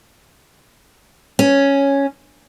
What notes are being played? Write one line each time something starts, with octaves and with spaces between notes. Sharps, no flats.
C#4